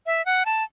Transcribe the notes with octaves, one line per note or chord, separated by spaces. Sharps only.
E5
F#5
A5